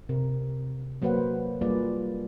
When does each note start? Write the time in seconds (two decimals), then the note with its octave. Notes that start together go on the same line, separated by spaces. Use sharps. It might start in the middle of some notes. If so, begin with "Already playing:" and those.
0.09 C3 A#4
1.02 F#3 A#3 F#4 B4 C5 F#5
1.61 G3 A#3 F4 G#4 B4 D5